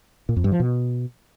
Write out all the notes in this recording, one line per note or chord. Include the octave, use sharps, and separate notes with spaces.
A#2
F2
G2
F3
B2